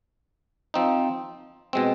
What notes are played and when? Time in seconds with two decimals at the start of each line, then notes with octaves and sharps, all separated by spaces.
0.74 F3 C4 D#4
1.73 B2 G#3 C4